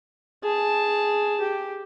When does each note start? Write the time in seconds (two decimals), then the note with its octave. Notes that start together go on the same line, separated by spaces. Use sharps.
0.43 G#4 A5
1.41 G4